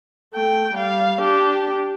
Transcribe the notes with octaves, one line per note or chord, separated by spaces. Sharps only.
A3 G5
G3 F5
D4 G4